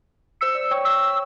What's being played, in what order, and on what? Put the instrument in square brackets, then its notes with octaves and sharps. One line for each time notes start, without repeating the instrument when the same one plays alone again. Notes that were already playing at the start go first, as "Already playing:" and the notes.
[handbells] C5 C#7 [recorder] E6
[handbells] D5
C#5 G5 C#6
[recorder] E6